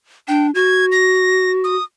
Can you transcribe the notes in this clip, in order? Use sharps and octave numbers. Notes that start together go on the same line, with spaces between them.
D4 G5
F#4 G#6
A#6
D#6